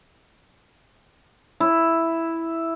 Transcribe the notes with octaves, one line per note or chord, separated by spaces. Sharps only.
E4